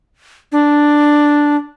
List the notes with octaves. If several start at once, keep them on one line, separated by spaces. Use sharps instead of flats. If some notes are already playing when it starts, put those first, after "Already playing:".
D4